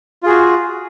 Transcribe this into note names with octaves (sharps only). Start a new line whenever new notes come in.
F4 F#4 G#4